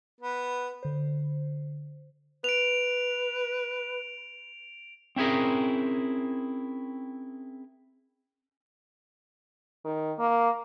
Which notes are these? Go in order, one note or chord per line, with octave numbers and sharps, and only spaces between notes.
B3
D3 C5
B4 D7 F7
C4 C#4 E4 G#4 A#4
D#3
A#3